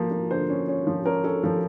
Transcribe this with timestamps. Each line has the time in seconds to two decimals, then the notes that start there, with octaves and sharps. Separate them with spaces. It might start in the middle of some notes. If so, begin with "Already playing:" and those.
Already playing: F3 A#3
0.11 A#3
0.31 D3 C5
0.50 C#4
0.68 C#4
0.87 F3
1.05 C#4 A#4
1.24 C#4 A4
1.43 F3 A4